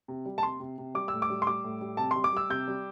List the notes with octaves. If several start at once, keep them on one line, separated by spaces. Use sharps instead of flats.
C3
G3
A5
C3 C6
C3
C3
G3 D6
A2 E6
D6
G3
C6
G3 D6
A2
G3
C3 A5
G3 C6
D6
G3 E6
C3 G6
G3